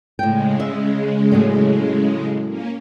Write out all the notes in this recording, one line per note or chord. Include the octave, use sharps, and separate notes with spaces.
A2 C#3 G#3 G5
E5
A2 F#3 A3
A#3 C#4